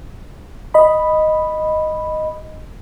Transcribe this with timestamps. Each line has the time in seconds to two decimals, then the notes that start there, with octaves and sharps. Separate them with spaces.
0.74 D#5 B5